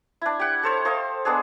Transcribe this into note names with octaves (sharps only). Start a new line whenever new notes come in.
D4 E4
G4 F#5
A4 C5 C#5
A4 C5 D#5 F5
G#3 B3 D4 G#4